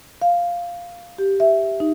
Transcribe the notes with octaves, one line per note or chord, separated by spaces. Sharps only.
F5
G4
E5
D#4